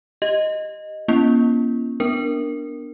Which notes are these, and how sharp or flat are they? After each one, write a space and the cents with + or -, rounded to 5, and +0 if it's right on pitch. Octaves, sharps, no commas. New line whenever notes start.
G4 +0 D#5 +0
A#3 +35 C#4 -10 E4 +35
B3 +0 D4 +0 A#4 +0